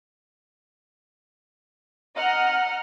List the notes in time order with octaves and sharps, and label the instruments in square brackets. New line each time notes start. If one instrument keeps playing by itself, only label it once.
[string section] D#5 F#5 A#5 F6